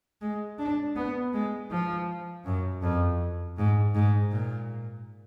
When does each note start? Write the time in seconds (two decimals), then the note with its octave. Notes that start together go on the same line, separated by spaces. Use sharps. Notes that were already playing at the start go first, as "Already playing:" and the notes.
0.21 G#3
0.59 D4
0.96 B3
1.33 G#3
1.71 F3
2.45 F#2
2.83 F2
3.58 G#2
3.95 G#2
4.32 A#2